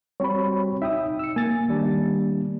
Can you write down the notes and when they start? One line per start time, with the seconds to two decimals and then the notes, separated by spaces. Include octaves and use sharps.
0.20 G3 C4 F#4 C#5 B5
0.82 D#4 E5 G5 D#6
1.19 E6 C#7
1.36 A#3 G#5 A6
1.69 D#3 G3 D4